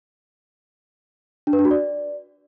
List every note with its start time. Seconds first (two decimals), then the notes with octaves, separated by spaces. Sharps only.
1.47 D4
1.53 B4
1.59 D4
1.65 F#4
1.71 D5